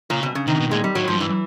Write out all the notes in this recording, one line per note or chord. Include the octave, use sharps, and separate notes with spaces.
A#2 C#3
B2
C#3
C3 D#3
B2
A#2 G#3
G3
A2 F#3
G#2 F3
F#2
G2 E3